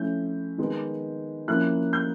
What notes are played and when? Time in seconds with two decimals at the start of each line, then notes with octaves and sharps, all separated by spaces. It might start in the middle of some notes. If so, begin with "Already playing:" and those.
Already playing: F3 A3 C#4 E4 G6
0.58 D#3 G#3 B3
1.48 F3 A#3 C#4 E4 F#6
1.93 G6